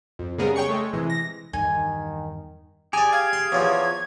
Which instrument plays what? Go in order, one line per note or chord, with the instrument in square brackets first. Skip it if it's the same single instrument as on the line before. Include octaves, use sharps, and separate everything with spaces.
[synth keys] F2
C#3 G3 G#3 B3 G#4 A#4
C#5 G5 C#6 C#7
G#3 A3
C3 E3 G#3
A#6
[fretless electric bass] E2 G2 G3 [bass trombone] D#3 [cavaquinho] G#5
[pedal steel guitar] G4 G#4 [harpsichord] D5 A#5 [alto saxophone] G#5
[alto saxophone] F5 [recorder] G#6
[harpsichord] C6
[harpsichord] E2 F3 [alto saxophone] C#5